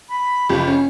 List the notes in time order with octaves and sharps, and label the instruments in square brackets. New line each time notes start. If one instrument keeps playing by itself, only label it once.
[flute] B5
[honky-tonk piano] F#1 F3 G4
C#4